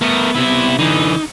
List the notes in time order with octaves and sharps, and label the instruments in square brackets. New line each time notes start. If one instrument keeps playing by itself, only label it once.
[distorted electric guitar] A3 A#4 [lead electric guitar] B3
[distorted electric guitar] C3 E4
[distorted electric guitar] D3 E3 [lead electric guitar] D#4